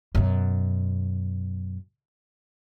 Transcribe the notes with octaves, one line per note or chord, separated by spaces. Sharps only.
F#2 B2